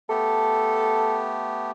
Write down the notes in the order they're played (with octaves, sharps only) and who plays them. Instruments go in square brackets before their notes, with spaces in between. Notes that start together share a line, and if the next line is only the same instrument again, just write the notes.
[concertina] A3 B3 G4 [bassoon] A4